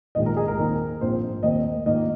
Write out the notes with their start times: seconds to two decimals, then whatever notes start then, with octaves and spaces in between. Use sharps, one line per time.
0.15 A#1 G#2 D#3 G#3 F4 D#5
0.26 A#4
0.37 G#4
0.48 A#4
0.58 D#2 D#3 C4 D#4
1.01 A#1 G#2 F3 C4 C5
1.43 D#2 D#3 C4 D#5
1.86 G#2 D#3 A#3 F4 D#5